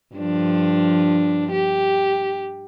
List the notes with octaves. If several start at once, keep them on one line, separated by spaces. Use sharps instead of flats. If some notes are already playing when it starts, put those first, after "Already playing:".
G2 F3 D4
G4